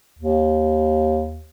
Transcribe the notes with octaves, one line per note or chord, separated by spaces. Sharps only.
D#2